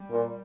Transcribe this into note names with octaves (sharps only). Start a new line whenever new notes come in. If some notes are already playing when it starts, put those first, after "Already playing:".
Already playing: G3
A#2